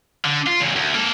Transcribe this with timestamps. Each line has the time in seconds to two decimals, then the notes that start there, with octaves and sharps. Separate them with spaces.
0.25 D3
0.47 F4
0.61 E2 C#3
0.76 D2
0.94 A#3 A4